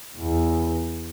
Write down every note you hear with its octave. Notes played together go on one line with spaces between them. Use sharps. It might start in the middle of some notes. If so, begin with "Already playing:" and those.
E2